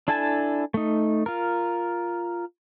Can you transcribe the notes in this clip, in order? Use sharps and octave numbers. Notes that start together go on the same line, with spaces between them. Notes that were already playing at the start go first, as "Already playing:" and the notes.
D4 E4 A4 G#5 A5
A3 D#4
F4 A#4